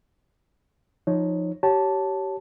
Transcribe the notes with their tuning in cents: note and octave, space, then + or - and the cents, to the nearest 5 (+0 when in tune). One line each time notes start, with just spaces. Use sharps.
F3 +0 D#4 +0 C#5 +0
G4 -25 C#5 +0 A5 +0